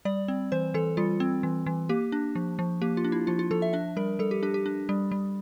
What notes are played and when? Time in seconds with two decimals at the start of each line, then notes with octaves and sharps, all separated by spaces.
0.05 G3 D5
0.28 C4
0.52 E3 C5
0.74 E3 A4
0.97 G3 F4
1.20 C4
1.43 E3
1.66 E3
1.89 A#3 G4
2.12 D4
2.35 F3
2.59 F3
2.82 A#3 G4
2.97 F4
3.04 D4
3.12 E4
3.27 F3 F4
3.39 F4
3.51 F3 A4
3.62 E5
3.73 D4 E5
3.97 G3 A#4
4.19 G3 A4
4.31 G4
4.43 D4 G4
4.54 G4
4.66 D4
4.89 G3
5.11 G3